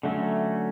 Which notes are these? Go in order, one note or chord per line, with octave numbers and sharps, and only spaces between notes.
D3 F#3 A3 C#4